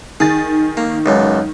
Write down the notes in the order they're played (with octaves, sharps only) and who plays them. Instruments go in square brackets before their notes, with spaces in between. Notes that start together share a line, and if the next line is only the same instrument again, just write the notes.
[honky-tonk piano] D#3 A6 [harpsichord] G#4
[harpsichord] A#3
C#2 F#2